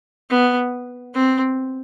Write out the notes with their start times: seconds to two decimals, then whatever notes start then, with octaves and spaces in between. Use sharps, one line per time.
0.30 B3
1.14 C4